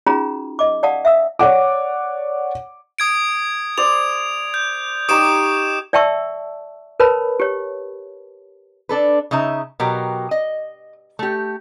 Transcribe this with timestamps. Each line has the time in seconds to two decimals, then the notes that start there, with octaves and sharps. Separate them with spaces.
0.07 C#4 D#4 F4 F#4 G#4 A#5
0.59 D#5 D6
0.83 D5 F5 F#5 A5 D#6
1.05 E5 F5 D#6 E6
1.39 C#5 D5 F#5 D6
2.99 D#6 G#6 D7
3.78 C5 D5 F7
4.54 G6
5.09 D#4 G4 C#5 D#6 D7 E7
5.93 D5 E5 G5 A5 C#6 E6
7.00 A#4 B4 C#5 A5 B5
7.40 G4 C#5
8.89 D4 A4 B4
9.31 C#3 D#4 D#5 E5 A#5
9.80 B2 F#3 G4 A#4 G5
10.31 D#5
11.19 A3 G4